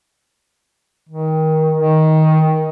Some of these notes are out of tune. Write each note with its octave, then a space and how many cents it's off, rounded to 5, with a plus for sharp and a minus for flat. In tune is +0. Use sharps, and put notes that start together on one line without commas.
D#3 +20
D#3 +15